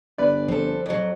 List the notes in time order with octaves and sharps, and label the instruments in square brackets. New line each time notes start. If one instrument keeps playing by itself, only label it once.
[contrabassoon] G1 [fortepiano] B4 D5
[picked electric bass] F3 [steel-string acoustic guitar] C4 A4
[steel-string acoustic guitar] F2 F#3